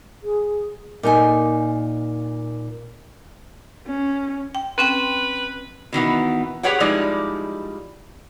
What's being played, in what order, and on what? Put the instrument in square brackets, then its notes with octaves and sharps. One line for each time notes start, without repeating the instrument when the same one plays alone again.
[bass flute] G#4
[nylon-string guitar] A#2 D#4 G#5
[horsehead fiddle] C#4
[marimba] G5
[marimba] C4 C#4 G5 [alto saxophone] B4
[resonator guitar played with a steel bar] B2 D#3 E3 B3
G4 G#4 B4 C#5 F#5 G5
F3 G3 G#3 D#4 E4 D5